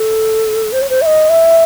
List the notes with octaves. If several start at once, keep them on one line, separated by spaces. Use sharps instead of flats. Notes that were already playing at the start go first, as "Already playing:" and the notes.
Already playing: A4
C5
C#5
C5
E5
D#5
E5